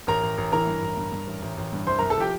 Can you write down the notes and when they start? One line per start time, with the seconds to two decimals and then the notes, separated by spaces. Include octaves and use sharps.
0.07 A1 A#4 A#5
0.23 A1
0.38 A1
0.52 E3 A#4 A#5
0.67 G2
0.82 A1
0.97 G2
1.12 G2
1.27 A1
1.42 A1
1.58 A1
1.73 G2
1.87 C2 C5 C6
1.98 C2 A#4 A#5
2.10 A4 A5
2.17 F3 G4 G5